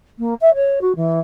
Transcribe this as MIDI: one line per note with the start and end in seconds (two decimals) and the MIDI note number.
0.18 0.34 58
0.41 0.54 76
0.54 0.79 73
0.81 0.92 66
0.95 1.20 52